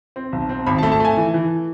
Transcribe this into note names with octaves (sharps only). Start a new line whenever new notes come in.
C4
B1
C4
G#1 B5
A5
A3
A5
A3 G#5
E3
E3